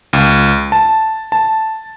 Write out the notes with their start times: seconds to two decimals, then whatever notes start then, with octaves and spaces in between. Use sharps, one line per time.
0.13 C#2
0.72 A5
1.32 A5